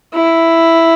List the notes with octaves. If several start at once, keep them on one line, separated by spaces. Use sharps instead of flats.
E4